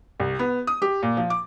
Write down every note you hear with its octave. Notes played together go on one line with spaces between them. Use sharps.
C2
B3
D#6
G4
A#2
F3
D6